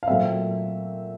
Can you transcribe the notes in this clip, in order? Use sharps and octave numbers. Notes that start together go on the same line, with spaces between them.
F5
A#2 F#3 A3 C4 E5